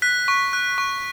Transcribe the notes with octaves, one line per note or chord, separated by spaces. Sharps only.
F#6 B6
C#6
F#6
C#6